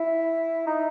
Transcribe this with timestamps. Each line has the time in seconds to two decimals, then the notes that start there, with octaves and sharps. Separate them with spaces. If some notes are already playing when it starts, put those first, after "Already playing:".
Already playing: E4
0.67 D#4